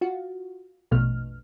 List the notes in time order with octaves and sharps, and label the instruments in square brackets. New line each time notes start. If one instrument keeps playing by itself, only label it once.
[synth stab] F4 F#4
A#1 F2 B2 A3 F6